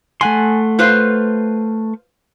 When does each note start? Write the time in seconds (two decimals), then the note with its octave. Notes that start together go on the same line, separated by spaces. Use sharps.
0.21 A3 F#5 G#5 C6
0.79 F4 B4 C5